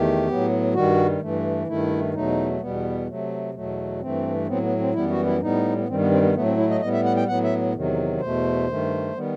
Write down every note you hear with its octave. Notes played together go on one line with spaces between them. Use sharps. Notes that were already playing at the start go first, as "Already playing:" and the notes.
Already playing: E2 D#3 A3 G4
A2 F#3 B3
G2 D#3 G3 F#4
G2 E3 A3
G2 D#3 A3 E4
E2 B2 F#3 A3 D#4
E2 B2 G3 B3
C3 F#3 A3
E2 B2 F#3 A3
G2 E3 A3 C4
A2 F#3 B3 C4
B3
C4
F#2 E3 G3 B3 E4
F#4
E4
A2 G3 B3 D#4
B3
G2 D#3 G3 C4
B3
C4
B3
A2 F#3 A3 B3
C4
E4
D#5
A2 G3 B3 D#5
E5
F#5
G5
A2 F#3 B3 F#5
E5
E2 C3 D#3 F#3
E2 B2 A3 C5
G2 D#3 A3
D#3 G3 B3